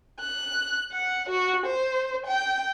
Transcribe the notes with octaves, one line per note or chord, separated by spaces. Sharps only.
F#6
F#5
F#4
C5
G5